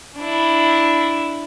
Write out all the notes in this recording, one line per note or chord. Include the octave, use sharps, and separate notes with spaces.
D4 E4